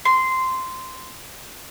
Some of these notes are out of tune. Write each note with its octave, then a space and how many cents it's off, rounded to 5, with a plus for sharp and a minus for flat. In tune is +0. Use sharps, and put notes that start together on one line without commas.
C6 -10